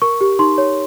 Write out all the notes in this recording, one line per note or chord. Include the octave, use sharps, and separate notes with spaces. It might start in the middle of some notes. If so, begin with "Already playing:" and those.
A#4 C#6
G4
D#4 C6
C#5